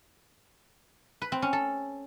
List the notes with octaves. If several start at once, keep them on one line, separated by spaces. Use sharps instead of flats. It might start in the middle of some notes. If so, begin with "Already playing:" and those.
B4
C4
C#4
A4